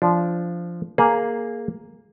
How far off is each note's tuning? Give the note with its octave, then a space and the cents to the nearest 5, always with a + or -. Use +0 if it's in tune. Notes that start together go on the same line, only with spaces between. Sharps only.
F3 -10 D4 -10
A#3 +0 G#4 +10 F5 +10